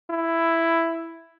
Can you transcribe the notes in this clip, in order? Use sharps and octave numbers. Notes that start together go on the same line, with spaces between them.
E4